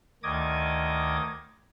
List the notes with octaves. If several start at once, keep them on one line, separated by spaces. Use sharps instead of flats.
D2 D#3 D#5 D6 D#6 G#6